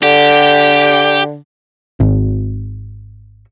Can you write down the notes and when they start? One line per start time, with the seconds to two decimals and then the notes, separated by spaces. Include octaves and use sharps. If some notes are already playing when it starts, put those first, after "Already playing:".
0.03 D3 G4
2.00 G#1